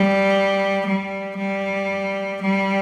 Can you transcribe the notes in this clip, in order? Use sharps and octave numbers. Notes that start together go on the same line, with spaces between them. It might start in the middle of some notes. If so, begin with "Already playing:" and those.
Already playing: G3
G3
G3
G3